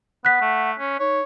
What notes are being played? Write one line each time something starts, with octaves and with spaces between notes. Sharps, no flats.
B3 F#5 F#6 B6
A3
C#4
D#4 C#5